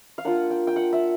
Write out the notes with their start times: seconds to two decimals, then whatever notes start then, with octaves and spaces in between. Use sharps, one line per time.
0.18 F5
0.25 A#3 D4 F4 F#5
0.50 G5
0.67 G5
0.76 F#5
0.93 E5